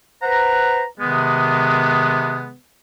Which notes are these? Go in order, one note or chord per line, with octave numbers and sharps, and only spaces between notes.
B4 C5 F#5 A#5
C3 D#3 G#3 B3